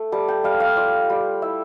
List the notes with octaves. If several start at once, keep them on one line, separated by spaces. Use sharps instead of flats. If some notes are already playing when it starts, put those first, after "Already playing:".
Already playing: A3
G3 A5
G5
G3 F5
F5
F4 D5
G3
E4 E5